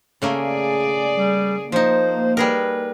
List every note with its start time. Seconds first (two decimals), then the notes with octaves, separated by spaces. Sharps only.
0.22 C#3 A3 A#3 G#4 D5
1.16 G3
1.72 F3 A#3 D#4 C5
2.37 G3 G#4 A#4 B4